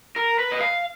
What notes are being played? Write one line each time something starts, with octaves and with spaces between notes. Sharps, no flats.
A#4
B4
D#5
F5